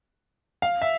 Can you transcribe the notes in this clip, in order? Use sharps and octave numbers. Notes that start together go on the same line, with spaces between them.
F5
E5